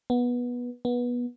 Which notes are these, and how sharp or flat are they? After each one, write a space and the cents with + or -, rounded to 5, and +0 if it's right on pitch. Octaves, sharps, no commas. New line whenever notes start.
B3 -15
B3 -20